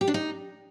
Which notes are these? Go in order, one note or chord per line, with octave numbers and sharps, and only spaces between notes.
G4
D4
D#4